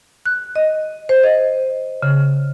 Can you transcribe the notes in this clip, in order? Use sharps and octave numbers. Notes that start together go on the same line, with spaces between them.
F#6
D#5
C5
D#5
C#3